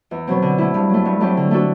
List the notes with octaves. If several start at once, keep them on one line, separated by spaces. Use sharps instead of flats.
E2
B2 F#3 C4
D3
A3 E4
G2
F#3 A3
G2
F#3 A3 C4 G4
D3
A3 D4 F#4 A4